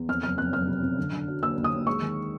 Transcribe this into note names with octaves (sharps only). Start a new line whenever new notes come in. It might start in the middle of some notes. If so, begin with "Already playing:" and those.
Already playing: E2
F2 F6
F#1 F6
F2 F#6
F#1 F6
C3
C3
D3
D3
F#3
D#2 E6
D#2
D#6
D#2
G#3 C#6
D#3